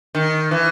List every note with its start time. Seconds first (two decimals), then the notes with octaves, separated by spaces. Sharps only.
0.15 D#3
0.51 E3